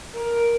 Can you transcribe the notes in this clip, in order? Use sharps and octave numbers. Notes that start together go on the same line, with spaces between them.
A#4